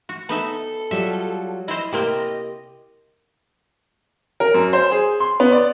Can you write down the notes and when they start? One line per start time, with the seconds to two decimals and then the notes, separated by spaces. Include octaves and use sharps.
0.09 F#4
0.29 B3 D#4 A4 E5
0.91 F#3 G3 F4 E5
1.68 E4 C5 D#5
1.93 C3 A#3 C4 G4
4.40 A#4
4.54 F#2
4.73 C5
4.91 G#4
5.20 C6
5.40 B3
5.52 D5